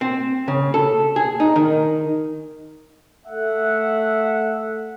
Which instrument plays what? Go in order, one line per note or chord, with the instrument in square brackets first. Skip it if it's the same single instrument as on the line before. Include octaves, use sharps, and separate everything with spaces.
[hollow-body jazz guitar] C4
C#3
A4
G#4
D#4
D#3
[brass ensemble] A3 E5 F#5